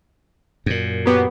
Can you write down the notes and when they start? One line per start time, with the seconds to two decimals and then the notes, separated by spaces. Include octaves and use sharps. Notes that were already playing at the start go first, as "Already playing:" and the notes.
0.66 F#2 A#2
1.06 F#3 B3 G4